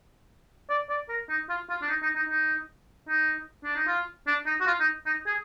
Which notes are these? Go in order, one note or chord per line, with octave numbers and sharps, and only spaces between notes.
D5
D5
A#4
D#4
F4
F4
D4
D#4
D#4
D#4
D#4
D#4
D4
D#4
F4
D4
D#4
F#4
F4
D#4
D#4
G#4